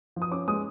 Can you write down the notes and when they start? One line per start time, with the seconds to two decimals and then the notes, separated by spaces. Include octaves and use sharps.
0.16 F3
0.22 D#6
0.31 C#4 D6
0.48 G#3 D#6